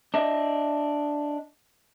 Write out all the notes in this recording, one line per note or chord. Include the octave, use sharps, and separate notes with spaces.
D4 D#5 E5